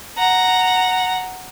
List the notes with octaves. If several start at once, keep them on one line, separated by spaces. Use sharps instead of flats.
F#5 A#5